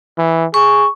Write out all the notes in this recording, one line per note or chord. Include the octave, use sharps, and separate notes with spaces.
E3
G#4 C#6